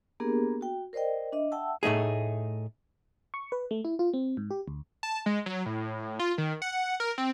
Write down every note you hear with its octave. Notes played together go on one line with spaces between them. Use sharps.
A#3 B3 D4 G4 G#4 A#4
F#4 G5
A#4 C5 D5 D#5 G5
D4 D#5 E5
E5 F#5 G5 A5 E6
A2 A3 D#4 G#4
C#6
B4
A3
E4
F4
C4
G#2
G4
D2
A5
G#3
F#3
A2
F4
D#3
F#5
A#4
C4